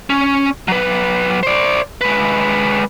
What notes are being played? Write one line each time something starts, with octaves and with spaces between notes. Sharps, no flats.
C#4
F#3 B4
C5 D5
G#3 B4